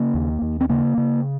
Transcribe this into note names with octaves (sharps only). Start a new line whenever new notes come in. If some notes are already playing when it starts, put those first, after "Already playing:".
Already playing: C#3 A#3
D#2
D#2
C4
C#3 A#3
C#3